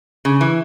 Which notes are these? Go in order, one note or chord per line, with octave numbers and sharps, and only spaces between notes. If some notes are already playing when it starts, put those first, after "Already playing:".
C#3
E3